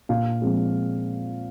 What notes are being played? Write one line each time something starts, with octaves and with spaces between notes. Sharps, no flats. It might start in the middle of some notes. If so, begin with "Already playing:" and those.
A#2 F5
F3 G#3 C4